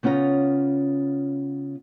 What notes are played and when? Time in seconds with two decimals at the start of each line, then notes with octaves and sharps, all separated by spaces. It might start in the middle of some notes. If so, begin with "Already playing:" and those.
0.03 C#3 B3 C#4 F4 A#5